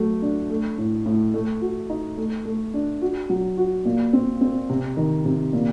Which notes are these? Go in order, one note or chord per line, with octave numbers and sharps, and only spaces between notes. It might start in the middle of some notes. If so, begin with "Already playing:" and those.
Already playing: F#3 A3
D4
A3
A2
A2
A3
F#4
D#4
A3
A3
D4
F#4
F#3
F#4
A#2
C4
C4
C3
D#3
C3
A#2